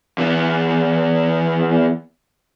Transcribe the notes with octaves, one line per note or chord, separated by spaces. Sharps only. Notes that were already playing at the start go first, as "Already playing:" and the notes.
E2 E3